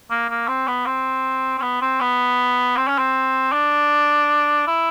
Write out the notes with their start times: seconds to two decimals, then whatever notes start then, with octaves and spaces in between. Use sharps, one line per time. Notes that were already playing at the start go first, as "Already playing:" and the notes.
0.11 A#3
0.30 A#3
0.48 C4
0.68 B3
0.86 C4
1.58 C4
1.62 B3
1.82 C4
2.01 B3
2.77 C4
2.88 C#4
2.98 C4
3.52 D4
4.67 E4